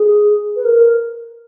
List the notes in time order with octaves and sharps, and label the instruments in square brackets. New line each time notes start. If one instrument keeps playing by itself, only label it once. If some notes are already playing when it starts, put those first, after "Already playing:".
Already playing: [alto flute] G#4
B4
A#4